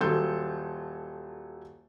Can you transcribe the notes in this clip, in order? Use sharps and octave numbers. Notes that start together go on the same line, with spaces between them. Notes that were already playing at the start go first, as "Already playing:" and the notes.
D#1 F#3 A4 C6 G6